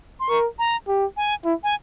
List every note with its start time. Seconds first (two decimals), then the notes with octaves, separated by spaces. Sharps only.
0.20 C6
0.29 A#4 C#6
0.59 A#5
0.88 G4
1.17 G#5
1.45 E4
1.63 G#5